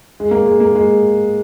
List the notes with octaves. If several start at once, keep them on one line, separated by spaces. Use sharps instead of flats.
G#3
A#3
G#3
A#3
G#3